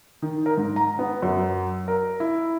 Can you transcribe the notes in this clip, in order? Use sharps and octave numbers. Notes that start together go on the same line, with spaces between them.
D#3
A#4
G#2
A#5
B3
F#2
A#4
E4